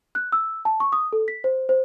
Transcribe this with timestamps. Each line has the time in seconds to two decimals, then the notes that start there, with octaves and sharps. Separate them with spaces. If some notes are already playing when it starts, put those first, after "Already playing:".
0.15 F#6
0.32 E6
0.65 A5
0.80 C#6
0.92 D#6
1.13 A4
1.28 B6
1.44 C5
1.69 C5